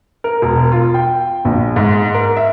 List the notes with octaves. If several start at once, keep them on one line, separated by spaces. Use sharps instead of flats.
A#4
E1
F4
G5
A#1
G#2
A#4
E5